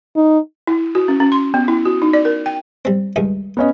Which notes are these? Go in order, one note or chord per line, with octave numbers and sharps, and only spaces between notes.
D#4
E4
F#4
C#4
C#4
C6
B3
E4
F#4
D#4
D5
A#4
G5
G3 C4
C#2 G2 D#3
B3 C#4 D#5